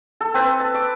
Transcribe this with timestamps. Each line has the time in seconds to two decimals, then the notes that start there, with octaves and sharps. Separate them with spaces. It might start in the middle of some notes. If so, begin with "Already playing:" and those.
0.21 A4
0.34 C4 B4
0.60 A5
0.74 D6